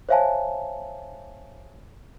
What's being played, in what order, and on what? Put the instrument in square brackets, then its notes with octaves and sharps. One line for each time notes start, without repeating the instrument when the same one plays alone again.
[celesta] C5 C#5 E5 F5 G#5 A5